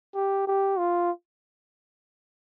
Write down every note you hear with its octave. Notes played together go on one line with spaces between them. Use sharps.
G4
G4
F4